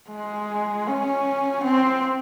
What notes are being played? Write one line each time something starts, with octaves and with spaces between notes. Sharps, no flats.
G#3
C#4
C4